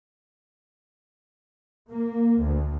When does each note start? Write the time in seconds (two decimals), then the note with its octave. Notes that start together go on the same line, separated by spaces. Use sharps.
1.90 A#3
2.39 D2